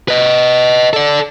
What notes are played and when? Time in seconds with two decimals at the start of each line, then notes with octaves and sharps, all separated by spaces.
0.08 B4 D#5
0.93 A4 D5